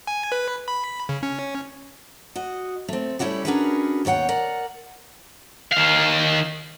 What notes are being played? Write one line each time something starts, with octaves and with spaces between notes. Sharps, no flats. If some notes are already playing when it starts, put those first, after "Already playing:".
G#5
B4
B5
C#3
C#4
F#4 D#5
A3 C4
G3 A3 C#4 E4 F#4 G4
C#4 D4 F#4 G#4 A#4 B4
D#2 B2 C#5 F#5 G5
A#4 D5 F#5
D#3 F5